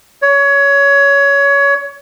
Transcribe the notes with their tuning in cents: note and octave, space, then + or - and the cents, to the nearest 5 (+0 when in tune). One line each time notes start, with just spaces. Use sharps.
C#5 +20